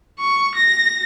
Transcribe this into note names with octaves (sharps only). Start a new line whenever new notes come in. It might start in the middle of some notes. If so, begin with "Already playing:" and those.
C#6
A#6